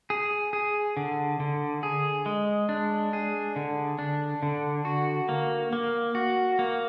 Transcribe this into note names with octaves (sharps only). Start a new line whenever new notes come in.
G#4
G#4
D3
D3
G#4
G#3
D4
G#4
D3
D4
D3
F#4
A#3
A#3
F#4
A#3